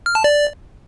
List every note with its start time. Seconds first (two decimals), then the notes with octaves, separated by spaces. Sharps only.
0.06 F6
0.15 A5
0.24 D5